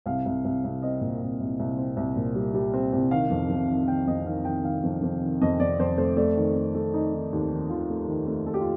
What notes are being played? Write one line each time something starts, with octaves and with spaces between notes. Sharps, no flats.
C2 F5
C2
C2
C2
C4 D#5
A#2
C2
C2
C2
C4
C2
A#2
G3
G3
C4
C2
D#3 F5
F2
F2
D#3
D#3 G5
F2 D#5
D#3 F5
D#3 G5
D#3 F5
F2
F2
D#3
F2 D#5
F2 D5
F2 C5
A3 C5
A3 D5
D#3
A3
A3
D#3 D#4
D#3
D#2
D#3
D#3 F4
A3
D#3
A3
A3 A4
G4
F4